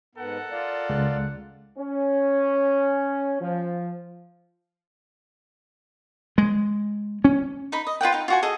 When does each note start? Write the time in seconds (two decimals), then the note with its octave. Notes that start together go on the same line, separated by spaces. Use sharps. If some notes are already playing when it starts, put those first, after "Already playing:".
0.15 G#2 B3 A4 A#4 F#5
0.51 F4 D5 F5
0.89 C#2 G#3 F#6
1.78 C#4
3.41 F3
6.38 G#3
7.25 C#4
7.72 D#4 B5
7.87 D#5
8.01 F4 B4 F#5 G5
8.12 D#4 F5
8.28 F4 F#4 G#5
8.42 G#4 A4 D#5